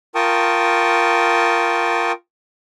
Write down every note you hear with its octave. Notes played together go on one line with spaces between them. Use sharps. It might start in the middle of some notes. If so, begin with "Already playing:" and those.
F4 A#4 G5 A5 C#6 D#6